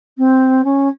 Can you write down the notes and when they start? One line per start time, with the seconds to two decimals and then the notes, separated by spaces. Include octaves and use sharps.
0.17 C4
0.64 C#4